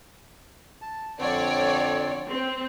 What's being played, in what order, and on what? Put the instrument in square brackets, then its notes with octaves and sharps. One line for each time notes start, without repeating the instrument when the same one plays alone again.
[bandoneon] A5
[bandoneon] F2 D3 C4 [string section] C#5 D5
[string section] C4